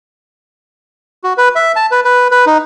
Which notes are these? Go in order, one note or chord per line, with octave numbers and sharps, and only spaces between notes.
F#4
B4
E5
A5
B4
B4
B4
D#4